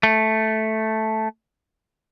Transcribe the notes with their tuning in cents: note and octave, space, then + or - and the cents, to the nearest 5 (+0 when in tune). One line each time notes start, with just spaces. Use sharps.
A3 -5